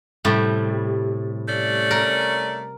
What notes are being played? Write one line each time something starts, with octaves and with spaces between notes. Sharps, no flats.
A2 C3 G3
A3 C#4 D5
A#4